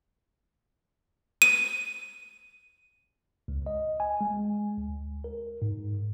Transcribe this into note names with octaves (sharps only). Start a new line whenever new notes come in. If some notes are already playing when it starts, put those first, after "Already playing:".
D#7
C#2
D#5
G#5
G#3
D2
A#4
G#2